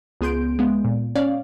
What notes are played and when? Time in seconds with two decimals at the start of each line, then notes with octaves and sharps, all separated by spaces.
0.21 C#2 B3 G#4 C6 G6 D7
0.59 G#3 B3
0.84 A#2
1.16 C#4 C#5 D5 F5